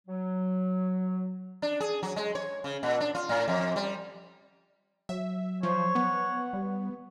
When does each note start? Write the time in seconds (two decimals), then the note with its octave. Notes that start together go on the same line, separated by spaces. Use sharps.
0.07 F#3
1.62 D4
1.80 G#4
2.03 F#3
2.16 G#3
2.35 C#5
2.64 C#3
2.83 A#2
3.00 D4
3.15 F4
3.29 A2
3.48 F2
3.76 G3
5.09 F#3 E5
5.63 F3 C5 C#5
5.95 B3 F#5
6.53 G3